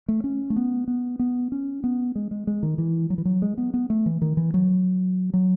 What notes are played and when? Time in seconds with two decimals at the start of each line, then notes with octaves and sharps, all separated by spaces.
0.08 A3
0.24 C#4
0.50 A3
0.56 B3
0.88 B3
1.19 B3
1.52 C#4
1.84 B3
2.15 G#3
2.31 G#3
2.47 G#3
2.63 D#3
2.78 E3
3.10 F#3
3.18 E3
3.25 F#3
3.42 G#3
3.58 B3
3.74 B3
3.90 A3
4.06 E3
4.22 D#3
4.37 E3
4.54 F#3
5.34 F#3